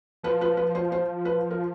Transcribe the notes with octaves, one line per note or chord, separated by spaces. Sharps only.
F3 B4
B4
B4
C5
C5
B4
A#4